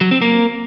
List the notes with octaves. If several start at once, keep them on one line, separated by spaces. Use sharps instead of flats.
F#3
C4
A#3